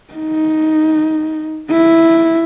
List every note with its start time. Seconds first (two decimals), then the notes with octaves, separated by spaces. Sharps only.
0.14 D#4
1.71 E4